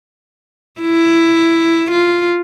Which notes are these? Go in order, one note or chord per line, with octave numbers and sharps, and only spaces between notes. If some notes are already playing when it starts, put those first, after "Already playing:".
E4
F4